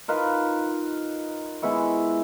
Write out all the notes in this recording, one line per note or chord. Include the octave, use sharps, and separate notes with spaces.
D#4 F4 A#4 B4
G#3 B3 E4 C#6